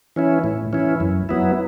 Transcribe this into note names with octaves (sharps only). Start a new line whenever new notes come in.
E3 C#4 E4
A2
E3 C#4 E4
F#2
F#3 B3 E4